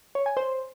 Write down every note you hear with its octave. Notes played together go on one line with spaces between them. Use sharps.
C#5
G#5
C5